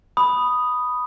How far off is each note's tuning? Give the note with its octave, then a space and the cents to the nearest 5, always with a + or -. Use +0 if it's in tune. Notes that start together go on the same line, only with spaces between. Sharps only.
B5 +0 D#6 +0